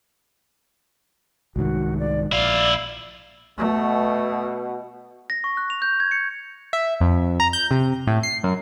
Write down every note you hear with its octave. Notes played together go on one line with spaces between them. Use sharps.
C2 G#2 D#3 F#4
D5
A#1 E4 D5 F5
B2 A3
A#6
C#6
F#6
F7
G6
G#6
C#7
E5
F2
A#5
G6
C3
A2
C7
F#2